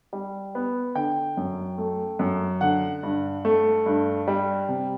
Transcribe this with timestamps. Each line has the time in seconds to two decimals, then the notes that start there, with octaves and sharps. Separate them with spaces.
0.13 G3
0.55 B3
0.95 D3 G5
1.37 F#2
1.78 A3
2.19 F#2
2.61 D3 F#5
3.03 G2
3.45 A3
3.86 G2
4.28 G3
4.69 C3